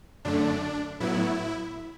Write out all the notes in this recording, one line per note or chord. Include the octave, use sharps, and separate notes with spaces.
F#2 D3 A3 D4
A2 F#3 B3 E4